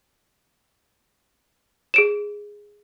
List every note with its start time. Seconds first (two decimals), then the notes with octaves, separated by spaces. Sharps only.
1.94 G#4 D7 E7